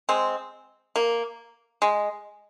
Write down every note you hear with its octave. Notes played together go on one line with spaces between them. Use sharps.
G#3 C4
A#3
G#3